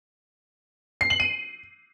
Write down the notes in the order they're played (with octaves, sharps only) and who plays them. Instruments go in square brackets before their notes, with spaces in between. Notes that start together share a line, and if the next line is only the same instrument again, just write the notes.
[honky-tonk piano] C7
F#7
D#7